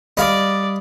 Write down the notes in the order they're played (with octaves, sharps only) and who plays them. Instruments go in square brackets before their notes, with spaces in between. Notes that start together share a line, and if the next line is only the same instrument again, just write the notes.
[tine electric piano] G3 B5 [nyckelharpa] D5 [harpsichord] D#5 F5